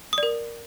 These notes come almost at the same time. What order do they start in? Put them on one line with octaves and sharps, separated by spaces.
D#6 D5 A#4